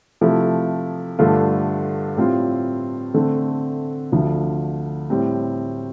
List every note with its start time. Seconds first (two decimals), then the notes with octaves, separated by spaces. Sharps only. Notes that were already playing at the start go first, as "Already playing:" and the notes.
0.21 C3 F3 A3 E4
1.19 G2 D3 A3 D4 F4
2.16 A2 G3 C4 F4
3.14 D3 A3 C4
4.12 D2 D3 F3
5.10 A2 G3 C4